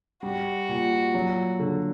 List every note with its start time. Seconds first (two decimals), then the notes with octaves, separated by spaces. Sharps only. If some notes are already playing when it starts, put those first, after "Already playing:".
0.23 G3 F#4
0.69 A#2
1.14 F#3
1.59 D3